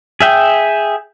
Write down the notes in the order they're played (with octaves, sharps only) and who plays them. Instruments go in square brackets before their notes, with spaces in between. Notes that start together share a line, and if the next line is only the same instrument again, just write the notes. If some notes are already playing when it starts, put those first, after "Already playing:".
[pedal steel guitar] G#4 E5 G5